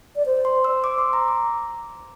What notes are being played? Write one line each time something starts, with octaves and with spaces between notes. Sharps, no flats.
D5
C5
C6
E6
D6
C6
A#5
D6